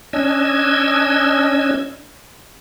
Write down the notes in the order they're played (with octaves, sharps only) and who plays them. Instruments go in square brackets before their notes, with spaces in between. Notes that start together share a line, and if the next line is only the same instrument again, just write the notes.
[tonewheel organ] C#4 D4 D#5 E6 G#6